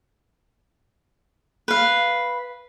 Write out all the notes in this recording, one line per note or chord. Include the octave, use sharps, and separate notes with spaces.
B4 F5